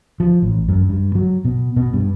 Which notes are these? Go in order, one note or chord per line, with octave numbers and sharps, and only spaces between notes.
F3
A1
F#2
G2
F#3
B2
B2
G2